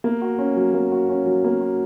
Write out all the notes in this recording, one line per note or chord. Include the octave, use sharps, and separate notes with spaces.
A#3
F#4
C#4
F#3
A#3
F#4
C#4
F#3
A#3
F#4